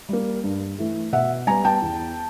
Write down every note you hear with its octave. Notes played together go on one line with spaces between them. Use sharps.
G3 A#3
G2
E3 A3
B2 E5 F#5
G3 B3 G#5 A#5
G5 A5
E2